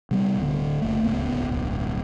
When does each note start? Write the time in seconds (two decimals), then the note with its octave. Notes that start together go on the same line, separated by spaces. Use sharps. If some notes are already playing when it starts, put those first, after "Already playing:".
0.11 C3 G3 B3
0.37 D1 D3
0.82 F#1 A3
1.03 D1 G1 C#2 B3
1.49 D1 B1